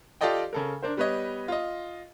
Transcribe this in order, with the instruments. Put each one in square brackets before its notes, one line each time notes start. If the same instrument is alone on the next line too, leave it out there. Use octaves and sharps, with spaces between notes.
[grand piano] F4 G4 A4 D5 D#5 G5
C#3 A4 A#4
D4 A#4 C5
G3 B3 B4 C#5 D#5
F4 D#5